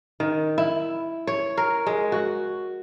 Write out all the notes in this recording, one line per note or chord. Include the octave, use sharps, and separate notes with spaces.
D#3
E4
C#5
A#4
G#3
F#4